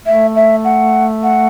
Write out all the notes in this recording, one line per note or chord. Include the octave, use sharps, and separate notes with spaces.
A3 E5
E5
F#5
F#5